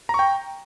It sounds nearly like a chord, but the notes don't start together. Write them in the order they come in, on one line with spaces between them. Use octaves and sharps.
A#5 C#6 G5